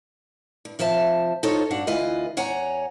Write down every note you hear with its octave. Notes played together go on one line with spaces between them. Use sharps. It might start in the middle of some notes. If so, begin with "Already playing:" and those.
G2
C3 F3 C5 E5 A5
D#4 F4 A4 C5 C#5
G2 D4 F#4 F#5
D2 E3 F4 B4 D#5
E2 C#5 F#5 G#5 A#5